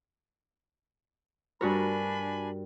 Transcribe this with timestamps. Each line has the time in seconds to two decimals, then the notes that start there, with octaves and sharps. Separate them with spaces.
1.61 G2 D4 F#4 A#4 G#5 B5